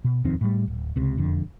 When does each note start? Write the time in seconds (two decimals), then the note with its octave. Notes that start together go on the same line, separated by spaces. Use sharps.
0.04 B2
0.24 D#1 F2 D#3 C4
0.41 A2 G3
0.68 D1
0.96 C#2 C3
1.17 E1 F2 D3